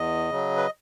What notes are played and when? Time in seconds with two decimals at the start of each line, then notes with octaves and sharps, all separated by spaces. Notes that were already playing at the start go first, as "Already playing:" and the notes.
Already playing: E2 D#5
0.30 C#3 F#3
0.57 B4